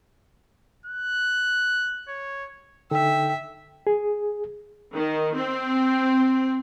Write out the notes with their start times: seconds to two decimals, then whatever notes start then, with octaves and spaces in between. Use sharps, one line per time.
0.86 F#6
2.08 C#5
2.91 D3 D#4 A4 E5 G5
3.87 G#4
4.94 D#3
5.38 C4